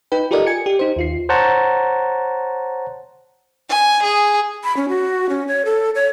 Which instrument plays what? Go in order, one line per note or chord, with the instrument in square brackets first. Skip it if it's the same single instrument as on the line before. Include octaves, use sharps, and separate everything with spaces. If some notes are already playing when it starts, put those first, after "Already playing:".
[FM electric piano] D#4 B4 G5
F4 G4 A4 A#4 D5 D#5
G#5 G#6 C#7
G4
D#4 C5
D#2 F4 C7
[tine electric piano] C5 C#5 F#5 A5 A#5
[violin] G#5
G#4
[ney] B5
C#4
F#4
C#4
C#5
A4
C#5